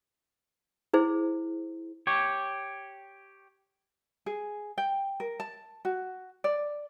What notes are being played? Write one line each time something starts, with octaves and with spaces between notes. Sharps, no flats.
E4 G#4 C5
G4 C#5
G#4
G5
A#4
A5
F#4
D5